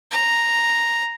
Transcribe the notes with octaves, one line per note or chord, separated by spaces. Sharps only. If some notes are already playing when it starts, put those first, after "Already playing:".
A#5